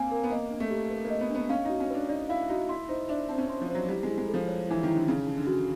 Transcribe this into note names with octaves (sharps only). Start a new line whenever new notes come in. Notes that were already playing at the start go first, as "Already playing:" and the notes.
Already playing: A#3 C4 F5 G#5
A#4
B3
A#3 D#5
D4
A3
G4
B4
A#3
D#5
B3
D4
B3
C#4 F5
D#4 F#4
C#4
D4 B4
D#4 D5
E4 F5
D#4 F#4
E4 C6
D#4 C5
D4 E5
C4 A5
C#4
C4 C6
F3
C5
F#3
G3 E4
G#3 E4
G#3
A4
F3
C#5
E3 E4
D#3
E4
D3
C#3 D#4
D#4
D3
F#4